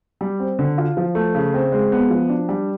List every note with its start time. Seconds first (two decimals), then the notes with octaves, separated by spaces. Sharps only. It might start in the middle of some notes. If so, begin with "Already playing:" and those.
0.21 G3
0.40 C4
0.59 D3
0.78 F4
0.97 F3
1.15 A3
1.35 C#3
1.54 C4
1.72 G#3
1.92 B3
2.10 F3
2.30 D4
2.49 G3